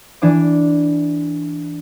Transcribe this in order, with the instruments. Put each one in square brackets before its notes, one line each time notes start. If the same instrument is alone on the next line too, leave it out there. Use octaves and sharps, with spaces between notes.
[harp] E3 D4 D5 D6